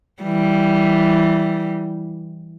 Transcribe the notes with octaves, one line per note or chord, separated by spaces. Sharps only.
E3 G3